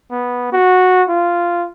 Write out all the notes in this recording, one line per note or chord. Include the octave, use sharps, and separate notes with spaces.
B3
F#4
F4